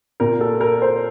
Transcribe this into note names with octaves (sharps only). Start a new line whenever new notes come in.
A#2 A#4
A4
A#4
C5